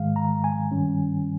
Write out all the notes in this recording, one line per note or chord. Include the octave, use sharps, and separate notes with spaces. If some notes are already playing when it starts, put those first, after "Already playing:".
Already playing: G#2 D#3 G#3 F5
A#5
G#5
G2 D#3 G3 C#4